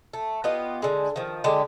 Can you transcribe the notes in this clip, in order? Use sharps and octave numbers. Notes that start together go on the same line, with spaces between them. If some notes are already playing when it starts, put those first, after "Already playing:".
A3
B3 F4 G4 D#5
D3 G#3
D#3 F3
D3 G#3 G4